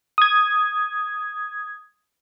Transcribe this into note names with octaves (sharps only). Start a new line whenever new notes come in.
D#6 G#6